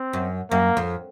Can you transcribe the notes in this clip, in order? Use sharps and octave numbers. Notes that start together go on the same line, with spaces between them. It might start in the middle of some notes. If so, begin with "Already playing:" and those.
Already playing: C4
F#2
F#2 A#3
F2